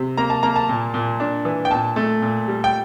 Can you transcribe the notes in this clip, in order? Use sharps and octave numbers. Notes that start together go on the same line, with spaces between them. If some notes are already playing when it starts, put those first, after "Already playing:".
Already playing: C3
A#3 A#5
A5
A#3 A#5
A5
A#2
A#2
D4
E3
G5
A#2 A5
A3
A#2
G3
G5